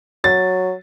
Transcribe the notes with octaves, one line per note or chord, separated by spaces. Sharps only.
F#3 A6